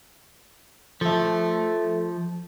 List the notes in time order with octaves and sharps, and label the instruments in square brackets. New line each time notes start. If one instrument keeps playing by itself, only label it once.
[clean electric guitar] F3 [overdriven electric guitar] A4 E5